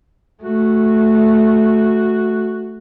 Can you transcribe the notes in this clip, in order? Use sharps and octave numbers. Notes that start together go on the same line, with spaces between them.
A3 F#4